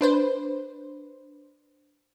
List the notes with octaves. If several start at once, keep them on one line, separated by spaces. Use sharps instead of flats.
D4 B4 C5